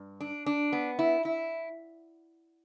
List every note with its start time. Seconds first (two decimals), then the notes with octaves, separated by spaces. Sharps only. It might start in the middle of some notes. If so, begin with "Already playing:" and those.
Already playing: G2
0.21 D4
0.46 D4
0.72 B3
0.99 E4
1.25 E4